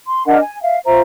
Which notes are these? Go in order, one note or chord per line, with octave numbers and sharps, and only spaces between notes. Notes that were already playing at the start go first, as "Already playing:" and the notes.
C6
D4 A#4 D#5 F#5
G#5
E5 F5
F4 C5 E5 A#5